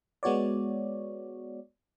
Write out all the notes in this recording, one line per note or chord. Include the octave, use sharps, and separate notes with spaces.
G#3 B3 F#4 C#5 D5